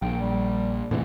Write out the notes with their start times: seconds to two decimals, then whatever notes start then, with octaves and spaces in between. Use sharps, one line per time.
0.02 A#1 G5
0.21 G3
0.91 A2 C3 E3